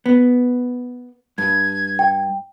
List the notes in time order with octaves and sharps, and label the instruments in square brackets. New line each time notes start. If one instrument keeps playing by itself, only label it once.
[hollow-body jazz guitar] B3
[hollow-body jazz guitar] G2 [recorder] G#6
[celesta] G5